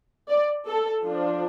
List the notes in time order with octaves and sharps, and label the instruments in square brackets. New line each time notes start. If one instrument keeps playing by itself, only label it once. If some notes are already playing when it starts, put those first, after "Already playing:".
[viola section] D5
A4
F3 D4